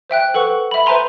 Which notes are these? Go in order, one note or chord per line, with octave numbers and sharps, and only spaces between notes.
C5 E5 G5 F#6
A4 B4 F#5 C#6
E5 B5
B4 C5 E5 G#5 A#5 C6